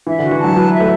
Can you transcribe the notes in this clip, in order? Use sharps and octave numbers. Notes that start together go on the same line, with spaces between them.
E3 E5
D3
F#4
E3
F#3 A5
F#3 B4
E5
A3